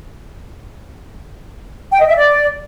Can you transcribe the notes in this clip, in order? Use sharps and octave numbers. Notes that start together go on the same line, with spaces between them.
G5
D#5
E5
D5